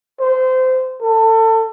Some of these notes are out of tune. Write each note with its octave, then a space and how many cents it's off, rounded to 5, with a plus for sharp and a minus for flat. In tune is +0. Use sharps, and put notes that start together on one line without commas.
C5 -25
A4 +25